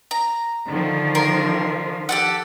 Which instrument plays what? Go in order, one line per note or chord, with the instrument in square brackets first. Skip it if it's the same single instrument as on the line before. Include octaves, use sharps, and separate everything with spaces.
[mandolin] A#5
[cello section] D3 D#3 F3
[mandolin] A#4 C6
G4 A4 F#5